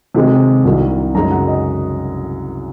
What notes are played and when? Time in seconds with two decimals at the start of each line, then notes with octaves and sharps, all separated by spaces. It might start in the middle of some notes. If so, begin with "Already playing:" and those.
0.14 C3 D#3 G#3
0.64 C2 C3 D#3
1.14 F#2 C#3 G#3 D#4 A#5
1.31 F#5
1.47 D#5